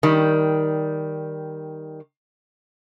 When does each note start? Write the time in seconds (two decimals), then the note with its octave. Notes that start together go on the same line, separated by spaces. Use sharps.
0.03 D#3 G3